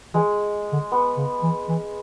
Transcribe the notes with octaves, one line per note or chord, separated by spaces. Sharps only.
E3 G#3
D3
B3
C#3
E3
E3